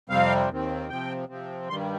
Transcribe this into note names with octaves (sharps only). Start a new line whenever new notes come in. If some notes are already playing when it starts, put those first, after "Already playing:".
F2 C3 G3 C4 F5
D#2 D#3 C4
C3 F3 C4 G5
C3 F3 C4
G2 D#3 G3 C6